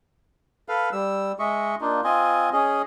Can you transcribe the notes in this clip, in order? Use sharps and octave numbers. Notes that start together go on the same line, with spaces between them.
A4 B4 F5
G3 E6
G#3 D#5 E5 C#6
A#3 D4 D#4 F4
C4 F4 D#5 G#5
C#4 G#4 D#5